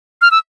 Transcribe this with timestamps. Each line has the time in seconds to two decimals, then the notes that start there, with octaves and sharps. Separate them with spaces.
0.21 F6
0.31 E6